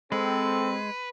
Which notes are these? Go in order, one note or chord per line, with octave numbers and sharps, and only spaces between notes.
G#3 C4 A4 B4